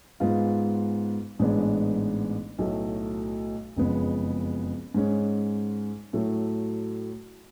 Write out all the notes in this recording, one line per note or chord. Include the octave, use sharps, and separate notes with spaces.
G#2 G#3 B3 F4
A1 G#2 G#3 B3 D4
B1 A2 F#3 A3
F#1 F2 C#3 G#3 B3
G#2 G#3 C#4
A2 F#3 A3